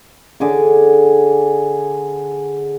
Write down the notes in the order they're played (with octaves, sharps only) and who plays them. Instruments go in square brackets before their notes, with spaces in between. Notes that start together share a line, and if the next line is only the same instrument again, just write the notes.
[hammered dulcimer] D3 G#4 D6